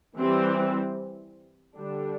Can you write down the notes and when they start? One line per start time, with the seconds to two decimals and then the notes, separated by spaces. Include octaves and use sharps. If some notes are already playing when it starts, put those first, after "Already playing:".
0.16 E3 G3 C4
1.77 D3 G3 D4